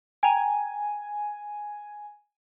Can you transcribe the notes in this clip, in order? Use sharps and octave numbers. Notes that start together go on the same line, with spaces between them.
G5 G#5 A#5